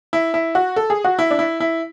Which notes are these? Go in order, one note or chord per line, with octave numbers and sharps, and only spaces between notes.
E4
E4
F#4
A4
G#4
F#4
E4
D4
E4
E4